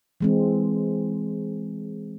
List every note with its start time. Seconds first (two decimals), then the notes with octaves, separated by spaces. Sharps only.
0.21 E3 G#3 C4